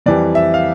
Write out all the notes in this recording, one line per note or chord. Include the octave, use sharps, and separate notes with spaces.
F2 E3 G3 D5
E5
F5